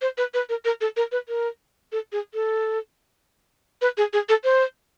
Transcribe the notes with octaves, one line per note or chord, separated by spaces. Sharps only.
C5
B4
B4
A#4
A#4
A4
A#4
B4
A#4
A4
G#4
A4
B4
G#4
G#4
A4
C5